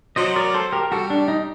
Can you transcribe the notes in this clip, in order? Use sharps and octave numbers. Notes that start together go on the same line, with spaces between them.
F#3 C5 D#5
A#4 D5
A4 C5
G4 A#4
G3 F#4 A4
D4
D#4